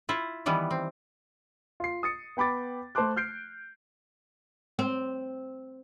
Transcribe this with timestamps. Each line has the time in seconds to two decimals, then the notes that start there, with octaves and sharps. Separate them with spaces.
0.09 E4 F4
0.46 D#3 E3 G3 B3
0.71 C4
1.80 F4 C7
2.03 D#6 A6 C#7
2.37 B3 G5 B5 D6 A6
2.95 A3 C5 A5 C6 D6 F#6
3.16 F6 G6 C7 D7
4.79 C4